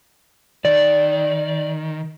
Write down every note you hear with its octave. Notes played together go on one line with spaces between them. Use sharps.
D#3 D5